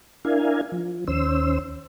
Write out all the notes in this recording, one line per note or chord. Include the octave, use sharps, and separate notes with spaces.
D4 E4 A#4 F5 G#5
F3
D#2 C#4 C5 E6